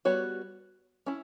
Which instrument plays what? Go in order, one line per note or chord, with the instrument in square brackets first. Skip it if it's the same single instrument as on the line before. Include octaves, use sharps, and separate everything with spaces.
[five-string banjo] G3 B3 F#4 C#5
C#4 E4